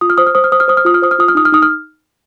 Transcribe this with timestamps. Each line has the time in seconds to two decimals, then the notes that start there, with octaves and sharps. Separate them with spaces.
0.01 F4 D#6
0.10 F6
0.18 C5 D#6
0.26 F6
0.35 C5 D#6
0.44 F6
0.52 C5 D#6
0.60 F6
0.68 C5 D#6
0.77 F6
0.85 F4 D#6
0.94 F6
1.02 C5 D#6
1.11 F6
1.19 F4 D#6
1.28 F6
1.35 D#4 D#6
1.45 F6
1.52 D#4 D#6
1.62 F6